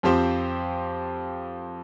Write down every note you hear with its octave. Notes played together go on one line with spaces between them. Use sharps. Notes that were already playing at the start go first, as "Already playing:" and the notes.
F2 F3 C4 G4 C5